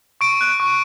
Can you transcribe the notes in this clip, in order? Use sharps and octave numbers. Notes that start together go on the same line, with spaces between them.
C#6 D7
F#6
C#6